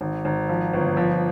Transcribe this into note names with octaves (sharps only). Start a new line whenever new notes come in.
G#1
G#1
F3
G1
F3